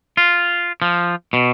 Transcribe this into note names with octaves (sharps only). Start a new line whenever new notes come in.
F4
F3
B2